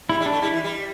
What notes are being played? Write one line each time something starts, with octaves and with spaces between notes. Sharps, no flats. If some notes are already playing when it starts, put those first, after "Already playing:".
G3 E4
G3
D4
A3
G3 E4
E3
G3